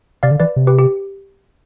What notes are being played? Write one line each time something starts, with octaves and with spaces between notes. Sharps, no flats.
C3 D5 F5
D3
E3 B4 D5
C3
G4 B4
G4